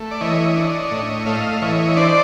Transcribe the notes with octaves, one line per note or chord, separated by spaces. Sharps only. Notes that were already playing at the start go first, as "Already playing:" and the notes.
Already playing: A3
D5
E3 C#5 D#5
D4
A2
A3 D#5 F5
E3 C#5 D#5
D4 C5 D5